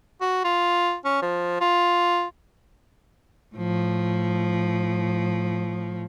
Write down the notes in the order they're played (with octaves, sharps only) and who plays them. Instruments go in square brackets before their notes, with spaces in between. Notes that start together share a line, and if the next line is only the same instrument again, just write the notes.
[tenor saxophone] F#4
F4
C#4
F3
F4
[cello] A2 F3